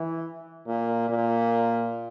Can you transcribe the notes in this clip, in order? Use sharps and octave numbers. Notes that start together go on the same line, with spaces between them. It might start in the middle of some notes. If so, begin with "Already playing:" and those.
Already playing: E3
A#2
A#2